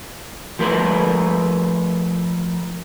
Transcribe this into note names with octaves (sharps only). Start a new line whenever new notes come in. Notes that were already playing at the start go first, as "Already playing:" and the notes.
F3 A3 A#4 B4